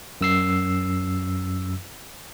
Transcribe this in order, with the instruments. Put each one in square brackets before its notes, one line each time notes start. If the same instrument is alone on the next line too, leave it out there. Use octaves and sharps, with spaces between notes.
[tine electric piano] F#2 E6 C7